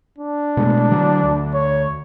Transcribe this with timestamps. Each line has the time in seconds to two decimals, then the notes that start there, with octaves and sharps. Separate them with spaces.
0.19 D4
0.57 B2 G#3 A3
0.91 D3 F#3
1.23 D2
1.54 C#5